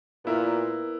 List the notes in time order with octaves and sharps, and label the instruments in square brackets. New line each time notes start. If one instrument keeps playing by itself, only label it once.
[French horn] A#2 [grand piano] B3 E4 A#4